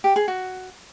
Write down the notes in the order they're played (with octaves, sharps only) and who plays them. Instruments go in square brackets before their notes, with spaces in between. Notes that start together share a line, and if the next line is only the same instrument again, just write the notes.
[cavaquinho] G4
G#4
F#4